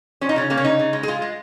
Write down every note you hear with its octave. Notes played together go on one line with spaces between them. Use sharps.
F3 C#4
D#4
C#3 C#4
C#3 A#3
C#4
C#3 D#4
C#3
G#3
G#4
G#3 F4
G#3